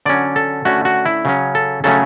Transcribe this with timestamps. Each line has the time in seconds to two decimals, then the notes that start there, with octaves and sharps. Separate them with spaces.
0.06 D3 F#3 C#4 D5
0.36 A4
0.65 D3 A3 C#4 F#4
0.85 F#4
1.05 E4
1.25 C#3 F#3 C#4
1.55 A4
1.84 C#3 F#3 A3 C#4 A4